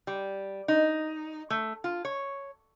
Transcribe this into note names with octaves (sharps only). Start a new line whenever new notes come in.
G3
D#4
A3
F4
C#5